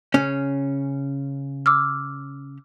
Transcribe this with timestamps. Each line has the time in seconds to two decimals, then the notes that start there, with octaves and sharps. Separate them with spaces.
0.14 C#3 C#4
1.66 D6 E6 F6